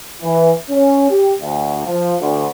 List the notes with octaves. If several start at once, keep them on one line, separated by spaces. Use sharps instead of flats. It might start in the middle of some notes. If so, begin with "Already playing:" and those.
E3
C#4
G4
D2
F3
D2